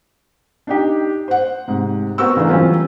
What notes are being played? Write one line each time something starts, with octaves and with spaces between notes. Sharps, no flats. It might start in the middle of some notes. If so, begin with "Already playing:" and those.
D4 D#4 G4
C5 F#5
G#2 C3
B3 C4 F#4 A#4 C#6 E6
C#3 E3 A3 D4 A#5
E3 F#3 G3 C4 C#4 F4